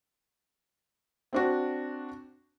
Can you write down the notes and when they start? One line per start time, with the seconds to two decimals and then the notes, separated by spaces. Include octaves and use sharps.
1.33 C4 D4 F#4